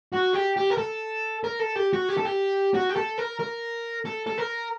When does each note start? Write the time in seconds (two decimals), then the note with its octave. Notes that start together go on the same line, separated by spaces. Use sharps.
0.14 F#4
0.34 G4
0.57 G4
0.70 A#4
0.78 A4
1.44 A#4
1.60 A4
1.76 G4
1.93 F#4
2.09 G4
2.17 A4
2.25 G4
2.74 F#4
2.89 G4
2.96 A4
3.18 A#4
3.39 A#4
4.06 A4
4.27 A4
4.38 A#4